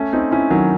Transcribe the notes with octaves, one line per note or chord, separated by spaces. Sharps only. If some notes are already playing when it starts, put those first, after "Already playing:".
Already playing: A3 C#4
C4 D#4
C#4 E4
D#3 F#3